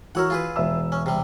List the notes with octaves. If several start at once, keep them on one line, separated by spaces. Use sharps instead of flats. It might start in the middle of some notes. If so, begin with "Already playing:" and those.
E3 F#4 A#4 C#5 F#5 E6
F4 G#4 B4
E1 E5 E6
C#4
C3 G3